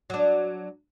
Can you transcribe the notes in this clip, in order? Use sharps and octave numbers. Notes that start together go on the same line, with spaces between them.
F#3 D4